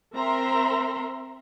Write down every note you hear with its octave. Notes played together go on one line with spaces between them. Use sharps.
C4 A#4 E5 A#5 C6